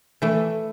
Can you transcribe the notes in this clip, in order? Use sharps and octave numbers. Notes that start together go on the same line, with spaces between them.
E3 A3